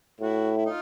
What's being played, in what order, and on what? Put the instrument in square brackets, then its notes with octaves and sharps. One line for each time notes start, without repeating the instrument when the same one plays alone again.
[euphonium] A2 [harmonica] E4 F#4
[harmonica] E4
D#4 F4